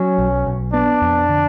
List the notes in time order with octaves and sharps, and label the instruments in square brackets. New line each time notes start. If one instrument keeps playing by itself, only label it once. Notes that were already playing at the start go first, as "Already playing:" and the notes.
Already playing: [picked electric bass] F#3 [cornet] C#4
[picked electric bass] B1
B1
[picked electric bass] B3 [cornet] D4
[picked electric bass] F2
D3